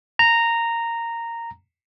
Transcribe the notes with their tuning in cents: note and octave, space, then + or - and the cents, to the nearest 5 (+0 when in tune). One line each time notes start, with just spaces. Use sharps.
A#5 -10